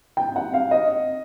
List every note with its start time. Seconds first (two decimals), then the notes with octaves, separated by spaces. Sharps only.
0.17 G5
0.36 F#5
0.54 F5
0.71 D#5